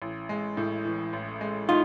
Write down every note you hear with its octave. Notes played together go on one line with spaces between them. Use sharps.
A1
G#3
A2
E3
A1
G#3
D#4 F4